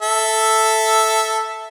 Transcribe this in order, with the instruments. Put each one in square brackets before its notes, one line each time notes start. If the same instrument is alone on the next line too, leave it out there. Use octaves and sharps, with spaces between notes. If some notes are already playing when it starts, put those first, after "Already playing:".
[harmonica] A4 E5